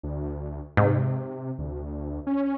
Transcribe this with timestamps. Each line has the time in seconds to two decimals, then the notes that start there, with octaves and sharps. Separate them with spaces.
0.03 D2
0.77 G#2 C3
1.59 D2
2.27 C#4